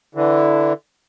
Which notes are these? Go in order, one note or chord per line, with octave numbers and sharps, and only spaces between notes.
D3 E3